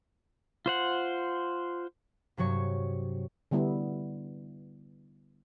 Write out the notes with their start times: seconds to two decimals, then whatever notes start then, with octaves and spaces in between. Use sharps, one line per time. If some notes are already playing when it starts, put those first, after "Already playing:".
0.66 F4 C5 F#5
2.37 G2 C3 F#3 C#5 C#6
3.51 D3 G3 B3 E4